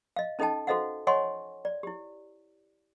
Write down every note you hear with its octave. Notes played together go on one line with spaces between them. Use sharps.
D#5 F5
C#4 D#4 A4 D#5 G5 A5
F#4 A4 C5 D#5 F5 F#5
C#5 D#5 F#5 G#5 C6 C#6
D5
E4 G4